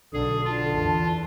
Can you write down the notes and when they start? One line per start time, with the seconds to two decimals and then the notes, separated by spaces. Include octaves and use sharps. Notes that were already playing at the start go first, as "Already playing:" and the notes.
0.13 B1 D3 G#4 A4
0.45 D3 F4 A5
0.77 E2 E3